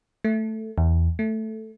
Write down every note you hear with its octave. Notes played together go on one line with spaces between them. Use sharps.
A3
E2
A3